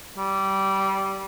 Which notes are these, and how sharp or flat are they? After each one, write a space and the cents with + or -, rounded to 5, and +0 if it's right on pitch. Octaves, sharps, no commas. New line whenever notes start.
G3 -15